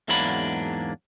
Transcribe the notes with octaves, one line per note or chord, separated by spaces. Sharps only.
E2 G#2 F#3 A#3 D4 B5